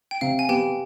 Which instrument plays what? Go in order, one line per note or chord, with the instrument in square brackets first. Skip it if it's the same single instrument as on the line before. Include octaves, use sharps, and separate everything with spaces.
[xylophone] G5
[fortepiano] C3 [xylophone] F5
[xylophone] G#5
[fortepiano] B3 [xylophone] G4 G5